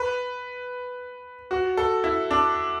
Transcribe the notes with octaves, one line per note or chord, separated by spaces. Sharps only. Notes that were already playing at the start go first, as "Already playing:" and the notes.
Already playing: B4
F#4
A4
E4
D4